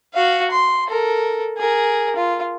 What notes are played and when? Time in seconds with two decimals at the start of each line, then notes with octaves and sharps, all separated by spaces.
0.14 F#4 F5
0.51 C6
0.87 A4 A#4
1.58 G#4 A#4
2.16 F4